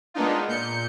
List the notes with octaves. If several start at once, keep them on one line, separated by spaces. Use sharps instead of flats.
G#3 A#3 B3 D4 D#4 F4
A#2 G6 C#7